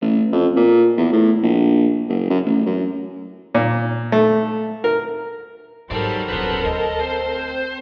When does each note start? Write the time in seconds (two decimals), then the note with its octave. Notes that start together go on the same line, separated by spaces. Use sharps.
0.02 A1
0.33 F2
0.57 A#2
0.97 E2
1.13 A2
1.43 A#1
2.09 F#1
2.30 F#2
2.46 A1
2.66 F#2
3.55 A#2
4.12 A3
4.84 A#4
5.91 G#2 F#3 G4 A4 A#4 C5 D5
6.29 D#1 A#1 B4 F#5
6.65 D2 D#5
7.00 C4 C5